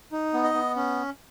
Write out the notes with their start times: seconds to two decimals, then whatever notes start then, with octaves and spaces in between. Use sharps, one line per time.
0.12 D#4
0.34 B3
0.44 D#5
0.54 B3
0.76 C#4